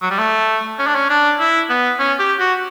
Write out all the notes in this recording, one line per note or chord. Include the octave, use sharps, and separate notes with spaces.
F#3
G3
A3
C#4
D4
C#4
D4
E4
B3
C#4
G4
F#4